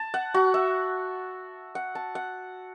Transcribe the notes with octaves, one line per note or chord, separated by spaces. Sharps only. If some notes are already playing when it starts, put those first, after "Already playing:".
Already playing: A5
F#5
F#4
E5
F#5
A5
F#5